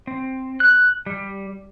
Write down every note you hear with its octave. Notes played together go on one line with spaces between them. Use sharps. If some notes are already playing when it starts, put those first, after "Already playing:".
C4
F#6
G3